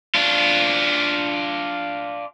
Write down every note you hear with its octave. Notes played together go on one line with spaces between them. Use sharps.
D4 F4